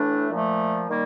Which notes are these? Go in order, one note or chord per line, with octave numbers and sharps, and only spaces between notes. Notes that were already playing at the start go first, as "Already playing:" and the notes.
Already playing: A2 E3 A3 D4
A#2 F3 A3
D#3 G3 A#3